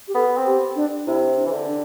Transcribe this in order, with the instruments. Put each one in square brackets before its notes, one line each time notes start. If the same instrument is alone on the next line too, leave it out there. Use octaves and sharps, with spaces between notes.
[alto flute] G4
[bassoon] B3 [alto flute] A4
[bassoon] C4
[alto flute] G4
D4
[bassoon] C3 [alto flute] E4
[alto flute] D4
[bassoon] E3
D3
[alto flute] D4